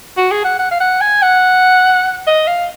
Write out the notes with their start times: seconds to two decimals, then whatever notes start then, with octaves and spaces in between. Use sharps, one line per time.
0.17 F#4
0.31 G#4
0.45 F#5
0.59 F#5
0.71 F5
0.80 F#5
1.01 G#5
1.22 F#5
2.27 D#5
2.48 F5